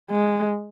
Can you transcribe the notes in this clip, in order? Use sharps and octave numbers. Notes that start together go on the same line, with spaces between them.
G#3